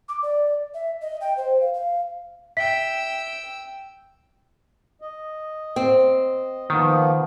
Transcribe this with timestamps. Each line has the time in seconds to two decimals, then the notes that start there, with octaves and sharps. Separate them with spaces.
0.09 D6
0.23 D5
0.74 E5
1.02 D#5
1.21 G5
1.37 C5
1.61 F5
1.74 F5
2.57 E5 G5 E6 B6
5.02 D#5
5.76 C4
6.70 D#3 F3 A#3 B3